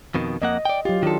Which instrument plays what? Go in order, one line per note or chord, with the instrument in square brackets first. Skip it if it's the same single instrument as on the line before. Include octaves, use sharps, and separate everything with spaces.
[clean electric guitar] F2 B2 D#3
[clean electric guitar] F2 A#3 F#5 [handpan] D#5
[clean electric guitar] D5 G5
[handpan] F#3 G4 [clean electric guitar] F4
[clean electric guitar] D#3 D4 A4 [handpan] F4